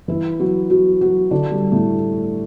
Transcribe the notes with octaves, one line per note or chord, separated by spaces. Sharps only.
E3 E4
F#3 F#4
F#3 F#4
F#3 F#4
D3 D4
G3
A2 A3